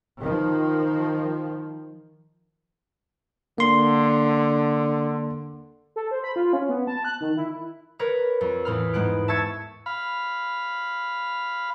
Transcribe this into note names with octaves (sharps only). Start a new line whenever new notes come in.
D#3 F3
D3 A#3 C6
A4
C5
B5
F4
C#4
B3
A5
F#6
D#3
E4
A#4 B4 C#5
F2
E2 A2 B4 B5 F6
G#2 G#3 B3 F#6 D7
E5 A5 C#6 E6 G#6 C#7
F5 B5